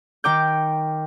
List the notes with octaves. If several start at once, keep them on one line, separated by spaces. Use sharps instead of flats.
D#3 G5 D6 G6